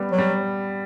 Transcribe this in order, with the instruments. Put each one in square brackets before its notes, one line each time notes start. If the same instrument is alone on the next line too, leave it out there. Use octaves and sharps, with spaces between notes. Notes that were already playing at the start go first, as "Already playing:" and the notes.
Already playing: [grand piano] G3 B3
[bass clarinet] F#3
[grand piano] G3